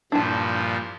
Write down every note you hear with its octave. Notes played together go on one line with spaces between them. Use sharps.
G2 A#2 F3 D4 E4 A5